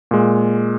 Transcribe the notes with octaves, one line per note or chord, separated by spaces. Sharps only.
A#2 G#3